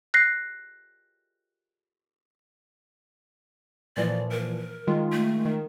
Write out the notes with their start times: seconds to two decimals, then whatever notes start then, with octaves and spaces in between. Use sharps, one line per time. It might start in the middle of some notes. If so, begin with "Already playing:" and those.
0.14 F#6 A#6 C7
3.97 A#2 E3 F3 D5
4.31 A#4
4.87 D#3 G#3 F4
5.12 A3
5.45 D#3